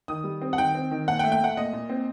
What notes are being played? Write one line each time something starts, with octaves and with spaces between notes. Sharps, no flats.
D#3 D#6
G3
C4
F#5
D#3 G5
C4
D#3
A#2 F#5
G5
A3
G5
A3 F#5
A#2 D#5
A#2
C4